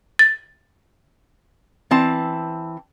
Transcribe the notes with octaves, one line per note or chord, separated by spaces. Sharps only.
A6
E3 C4 A5